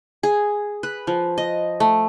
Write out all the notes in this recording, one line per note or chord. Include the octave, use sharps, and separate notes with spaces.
G#4
B4
F3
D#5
A3